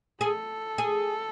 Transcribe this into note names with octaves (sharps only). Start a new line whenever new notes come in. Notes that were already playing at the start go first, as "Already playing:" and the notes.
G#4 A4
G#4